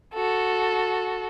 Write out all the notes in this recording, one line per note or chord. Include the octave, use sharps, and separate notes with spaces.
F#4 A4